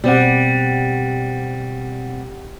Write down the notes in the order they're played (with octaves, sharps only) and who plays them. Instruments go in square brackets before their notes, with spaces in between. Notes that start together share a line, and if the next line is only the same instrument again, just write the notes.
[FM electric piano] B2 C4 F#5 [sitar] G3